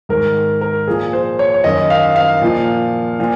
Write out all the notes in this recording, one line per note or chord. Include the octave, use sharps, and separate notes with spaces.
G#2 D#3 A#4
A#4
A#2 F3 G#4
C5
C#5
C#5
F#2 D#3 D#5
F5
F5
A#2 F3
A#2 F3